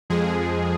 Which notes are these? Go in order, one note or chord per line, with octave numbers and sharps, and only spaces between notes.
F2 F3 G#3 G#4